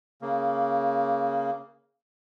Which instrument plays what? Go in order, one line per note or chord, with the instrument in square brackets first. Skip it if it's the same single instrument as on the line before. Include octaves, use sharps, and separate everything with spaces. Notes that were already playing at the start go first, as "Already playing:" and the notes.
[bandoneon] C#3 A#3